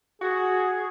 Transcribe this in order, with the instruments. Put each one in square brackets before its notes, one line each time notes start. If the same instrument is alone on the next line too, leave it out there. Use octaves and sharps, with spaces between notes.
[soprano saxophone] F#4 [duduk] G#4